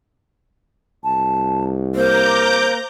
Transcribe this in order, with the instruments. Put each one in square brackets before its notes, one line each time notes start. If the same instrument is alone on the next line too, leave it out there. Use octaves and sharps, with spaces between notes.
[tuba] C2 [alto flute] A5
[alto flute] A#3 [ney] C5 [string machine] A#5 D6 G6